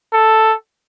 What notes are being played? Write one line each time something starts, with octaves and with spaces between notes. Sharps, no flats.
A4